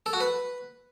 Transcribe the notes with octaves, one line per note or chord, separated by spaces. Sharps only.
A4
F#4
B4